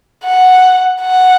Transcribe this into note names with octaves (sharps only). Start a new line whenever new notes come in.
F#5
F#5